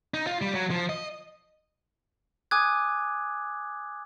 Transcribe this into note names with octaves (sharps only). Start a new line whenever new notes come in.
D#4
F4
G3
F#3
F3
D#5
G#5 D6 D#6 F#6 G#6